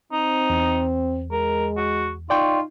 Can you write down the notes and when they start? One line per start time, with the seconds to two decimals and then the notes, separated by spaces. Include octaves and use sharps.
0.12 C4 D#4
0.50 E2
1.32 G#3 A#4
1.77 F#4
2.30 D#4 F4 D5 G5 C#6